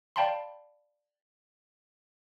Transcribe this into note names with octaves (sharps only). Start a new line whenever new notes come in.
D5 F5 G5 A5 B5 C6